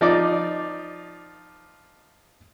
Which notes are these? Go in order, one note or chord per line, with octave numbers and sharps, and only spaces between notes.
F3 D#4 D5 D6